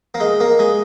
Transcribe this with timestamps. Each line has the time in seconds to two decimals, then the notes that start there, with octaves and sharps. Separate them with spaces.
0.14 A#3
0.20 G#3
0.40 A#3
0.59 G#3